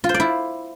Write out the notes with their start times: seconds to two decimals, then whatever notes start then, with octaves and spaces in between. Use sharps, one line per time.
0.04 F4
0.09 C5
0.14 D5
0.20 E4